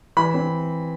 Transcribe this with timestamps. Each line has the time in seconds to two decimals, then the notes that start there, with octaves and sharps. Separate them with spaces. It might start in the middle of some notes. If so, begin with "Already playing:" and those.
0.17 E3 B5
0.34 C4